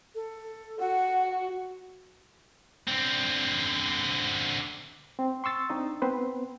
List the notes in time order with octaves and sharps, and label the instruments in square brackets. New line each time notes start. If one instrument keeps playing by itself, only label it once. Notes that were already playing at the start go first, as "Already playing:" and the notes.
[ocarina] A4
[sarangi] F#4 [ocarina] F#5
[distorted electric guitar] D3 C4
[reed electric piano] C4
C6 C#6 E6 A6
C4 D4 D#4 D#5
B3 C4 B4 C5